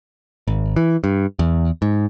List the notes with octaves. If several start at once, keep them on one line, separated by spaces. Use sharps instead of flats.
G#1
E3
G2
E2
G#2